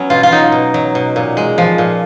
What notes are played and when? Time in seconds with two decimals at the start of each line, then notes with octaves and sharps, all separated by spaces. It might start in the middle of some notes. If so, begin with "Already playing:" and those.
Already playing: F#3 B3 C#4
0.10 B2 F4
0.23 F4
0.32 F#3 D#4
0.52 B2
0.74 F#3
0.95 B2
1.16 A#2
1.37 G#3
1.58 F3
1.78 A#2